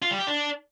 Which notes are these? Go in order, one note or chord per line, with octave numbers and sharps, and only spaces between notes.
F4
G3
G4
D4